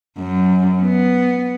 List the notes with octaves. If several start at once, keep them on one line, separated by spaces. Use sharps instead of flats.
F#2
B3